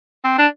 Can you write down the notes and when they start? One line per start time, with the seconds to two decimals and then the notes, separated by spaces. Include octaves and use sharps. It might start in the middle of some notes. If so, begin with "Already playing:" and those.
0.24 C4
0.38 D4